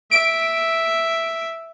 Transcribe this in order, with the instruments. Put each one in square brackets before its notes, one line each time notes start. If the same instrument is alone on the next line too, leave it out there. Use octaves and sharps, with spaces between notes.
[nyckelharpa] E5 [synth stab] D7